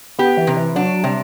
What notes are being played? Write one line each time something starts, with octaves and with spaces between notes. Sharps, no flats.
B3 G4
E3
C3
E3
F#3 D4
C3 G3